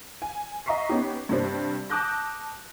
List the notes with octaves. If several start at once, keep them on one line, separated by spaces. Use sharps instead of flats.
G#5
D#5 E5 A#5 C#6 B6 C7
B3 C#4 D#4 G4
G2 C3 G3 C4
A5 D6 D#6 F#6 G6 A#6